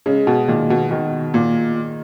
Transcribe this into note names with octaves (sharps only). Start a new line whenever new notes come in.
C#3 G#3
B2
A#2 D#3
B2
B2 D#3
A#2